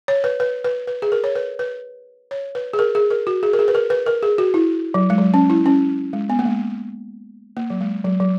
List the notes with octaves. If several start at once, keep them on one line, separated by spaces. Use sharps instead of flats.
C#5
B4
B4
B4
B4
G#4
A#4
C#5
B4
B4
C#5
B4
G#4
A#4
G#4
A#4
F#4
G#4
A#4
G#4
B4
A#4
B4
A#4
G#4
F#4
E4
F#3
G#3
F#3
C#4
E4
C#4
G#3
B3
A#3
G#3
A#3
F#3
G#3
F#3
F#3